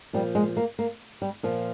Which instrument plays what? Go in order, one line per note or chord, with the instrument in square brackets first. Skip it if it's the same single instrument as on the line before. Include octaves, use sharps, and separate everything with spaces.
[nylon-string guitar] A#2 F3 G3
G#3
A#3
A#3
G3
A#2 F3